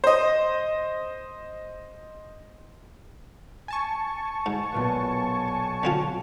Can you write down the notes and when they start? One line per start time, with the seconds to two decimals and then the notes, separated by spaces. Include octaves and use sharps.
0.04 C5 D#5
3.68 G#5 A5 C#6
4.46 G#2
4.72 B1 A#2 B3
5.83 D3 C4 F4